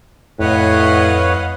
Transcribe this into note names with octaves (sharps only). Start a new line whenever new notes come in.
F2 A2 B4 C#5 D#5 F5 F#5